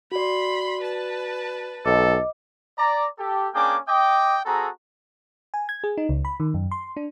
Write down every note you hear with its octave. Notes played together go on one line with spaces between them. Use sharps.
F#4 D5 B5 C6
B4 A5
B1 A4 D#5 D6
D5 A#5
G4 A4
A#3 C#4 D4 G#4 G5 D6
D#5 G5 D6
C4 F#4 G#4 A4 A#5
G#5
G#6
G#4
D#4
C#2
B5
D#3
F#2
C6
D4